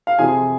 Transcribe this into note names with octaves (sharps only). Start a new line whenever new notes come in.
F5
F2 C3 F3 G#4 G#5